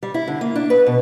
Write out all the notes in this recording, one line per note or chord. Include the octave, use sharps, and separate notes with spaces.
G3
E4
D3
A#3
D4
B4
B2